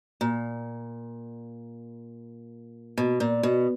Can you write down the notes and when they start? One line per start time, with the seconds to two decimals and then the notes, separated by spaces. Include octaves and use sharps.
0.21 A#2
2.98 B2
3.20 A#2
3.43 B2